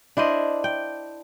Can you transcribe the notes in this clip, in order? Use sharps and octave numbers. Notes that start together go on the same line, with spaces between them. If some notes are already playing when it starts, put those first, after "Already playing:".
D4 E4 C5 D#5
G5